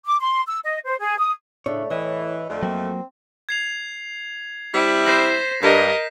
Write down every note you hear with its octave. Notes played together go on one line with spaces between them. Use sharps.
D6
C6
E6
D#5
C5
G#4
D#6
A2 C#3 A3 D4 C#5
A2 E3 D#5
F2 D3 A3
F#3 A#3 C4
G#6 C7 F7
G3 C4 E4 B6
C5 A#6 C7 E7
G2 A#4 D#5 G6 B6